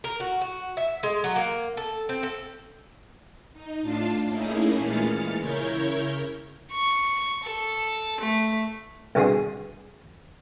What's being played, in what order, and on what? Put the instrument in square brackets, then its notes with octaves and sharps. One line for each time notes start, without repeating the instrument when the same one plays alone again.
[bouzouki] A#4
F#4
F#4
E5
G#3
F#3
A#3
A4
C4
A4
[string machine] D#4
A2 D4 F4 A5 A6 C7
A3 A#3 C#4 D#4 E4 G#4
A#2 E3 G#3 F6 A6 C#7
C#3 E4 A#4 C#5 C#6 G6
[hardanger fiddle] C#6
A4
A3
[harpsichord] C2 B2 D3 G#4 C6 D#6